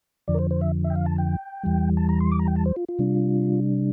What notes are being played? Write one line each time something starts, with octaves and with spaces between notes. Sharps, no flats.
F2 D3 F3 D5
A#4
C5
C5
E5
E5
G5
F5
A5
G5
E2 E3 G3
A5
A#5
C6
D6
A#5
G5
A5
C5
F4
F4
C3 G3 D4